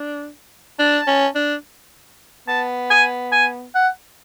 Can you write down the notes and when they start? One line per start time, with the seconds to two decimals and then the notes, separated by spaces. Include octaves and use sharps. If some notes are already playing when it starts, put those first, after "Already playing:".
Already playing: D4
0.79 D4 A5
1.07 C#4
1.35 D4
2.48 B3 A5
2.91 G#5
3.32 G#5
3.75 F#5